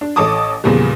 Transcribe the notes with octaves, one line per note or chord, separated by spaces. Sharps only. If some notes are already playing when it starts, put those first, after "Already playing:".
D4
A1 A4 C#5 A5 D6 D#6
E2 A#2 C#3 F3 G3